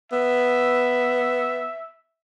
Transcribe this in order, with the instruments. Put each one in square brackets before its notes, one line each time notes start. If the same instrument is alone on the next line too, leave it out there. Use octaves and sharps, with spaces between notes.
[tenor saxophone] B3 [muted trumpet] E5